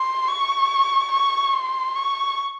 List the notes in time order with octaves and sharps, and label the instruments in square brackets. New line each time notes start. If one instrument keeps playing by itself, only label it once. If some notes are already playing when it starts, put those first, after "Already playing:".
Already playing: [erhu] C6
C#6
C#6
C6
C#6